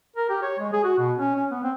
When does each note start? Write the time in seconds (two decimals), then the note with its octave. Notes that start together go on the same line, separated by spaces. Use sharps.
0.16 A#4
0.29 G4
0.42 C#5
0.59 G#3
0.73 G#4
0.84 F#4
0.99 B2
1.18 C#4
1.35 C#4
1.51 B3
1.63 C4